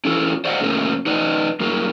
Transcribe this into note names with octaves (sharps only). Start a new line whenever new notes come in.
C#4 E4 F4 A4
C5 D5 D#5 F5 F#5
F#2 C#3 A3 A#3 C#4
D#4 B4 D5 D#5
G2 F#3 A#3